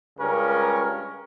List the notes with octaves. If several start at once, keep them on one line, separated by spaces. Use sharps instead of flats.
C#2 G2 C#3 C#4 A#4